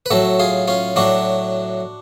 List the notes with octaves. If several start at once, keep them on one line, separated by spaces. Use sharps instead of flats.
B4
A2 F#3 F#4 A4
F4 G#4
C#4 F4
A2 F#3 D4 F#4